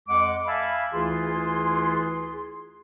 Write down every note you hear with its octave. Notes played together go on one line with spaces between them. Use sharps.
F2 G#3 F#5 D6
E5 F5 G#5 A5 B5
D2 E3 E4 F4 G#4 C6